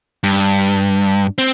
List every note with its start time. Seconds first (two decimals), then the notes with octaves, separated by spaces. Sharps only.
0.24 G2
1.38 C4